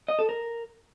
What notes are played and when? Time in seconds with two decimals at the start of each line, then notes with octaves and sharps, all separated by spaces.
0.08 D#5
0.19 A4
0.29 A#4